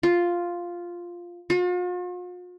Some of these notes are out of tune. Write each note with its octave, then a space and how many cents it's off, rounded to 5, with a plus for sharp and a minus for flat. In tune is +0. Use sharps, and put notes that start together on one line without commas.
F4 +0
F4 +45